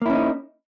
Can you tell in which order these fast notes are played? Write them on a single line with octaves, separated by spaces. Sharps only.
A#3 E4 C#4 D#4